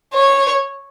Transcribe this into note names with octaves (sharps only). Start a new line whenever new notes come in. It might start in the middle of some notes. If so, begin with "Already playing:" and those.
C#5